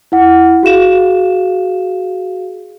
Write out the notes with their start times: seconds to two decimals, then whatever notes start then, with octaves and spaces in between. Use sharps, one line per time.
0.12 E4 F#5
0.63 F#4 G#4 F5 E7